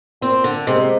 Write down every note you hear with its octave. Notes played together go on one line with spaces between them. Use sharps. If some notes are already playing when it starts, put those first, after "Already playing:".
A#2 C4
D3
C3 G#3 C4 D#4